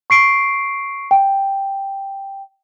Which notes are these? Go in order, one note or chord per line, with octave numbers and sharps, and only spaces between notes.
C#6 C7 D7
G5